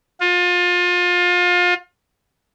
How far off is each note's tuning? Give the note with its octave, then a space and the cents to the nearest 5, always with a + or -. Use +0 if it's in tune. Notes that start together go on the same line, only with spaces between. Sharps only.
F4 +30